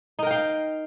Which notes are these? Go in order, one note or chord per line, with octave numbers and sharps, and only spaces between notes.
D#4 A#4 F5 G5